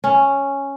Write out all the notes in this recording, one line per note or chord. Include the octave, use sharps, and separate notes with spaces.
C#4